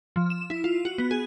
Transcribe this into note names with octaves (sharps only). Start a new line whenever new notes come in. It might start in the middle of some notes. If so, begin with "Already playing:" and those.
F3
E7
E4
F4
F#4
B3
G#4